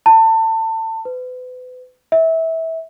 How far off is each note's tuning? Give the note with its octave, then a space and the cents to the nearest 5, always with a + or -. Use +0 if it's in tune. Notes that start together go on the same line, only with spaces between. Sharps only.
A5 +30
B4 +35
E5 -25